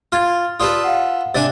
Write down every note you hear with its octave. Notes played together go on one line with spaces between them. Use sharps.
F4 F6 G#6 A6
F4 G4 A4 B4 D5 D#6
F5 F#5
C3 D4 D5 G#5 A6